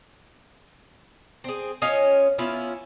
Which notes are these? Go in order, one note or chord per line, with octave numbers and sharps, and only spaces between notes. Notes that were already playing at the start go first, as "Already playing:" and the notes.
C4 G#4
C#4 F4 C#5 D#5
B3 C#4 E4 F4